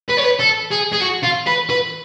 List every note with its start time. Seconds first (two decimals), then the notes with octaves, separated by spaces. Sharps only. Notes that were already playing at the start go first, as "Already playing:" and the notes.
0.10 B4
0.18 C#5
0.25 B4
0.40 A4
0.72 G#4
0.93 G#4
1.01 F#4
1.24 F4
1.47 B4
1.70 B4